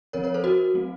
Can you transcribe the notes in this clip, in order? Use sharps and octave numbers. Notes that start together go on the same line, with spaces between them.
F3 C4 A#4 C#5
A#4 C#5
A4 C5
F#4 A#4
F#3 A3 C4